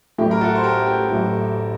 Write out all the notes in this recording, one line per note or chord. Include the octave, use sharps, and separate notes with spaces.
A1 A2 F#3 A3 G4
A#4
F#4 A4
C5
G4 A#4
G4
A1 A2 F#3 A3